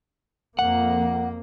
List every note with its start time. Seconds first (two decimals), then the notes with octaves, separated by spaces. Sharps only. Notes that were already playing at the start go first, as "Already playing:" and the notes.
0.59 F2 A#3 F#5